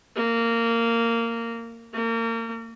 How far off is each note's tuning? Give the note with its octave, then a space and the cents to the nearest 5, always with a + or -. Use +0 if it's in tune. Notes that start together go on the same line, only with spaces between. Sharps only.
A#3 -15
A#3 -35